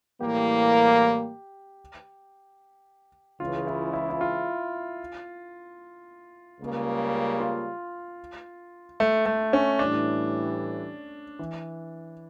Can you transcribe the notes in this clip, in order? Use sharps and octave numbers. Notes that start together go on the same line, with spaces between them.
A2 E3 G3 A#3 G4
C#2 C#3 E3 F4
E4
E4
E4
F4
C#2 C#3 G3 A#3
F4
A3
A3
C#4
A2 E3 G3 D4
E3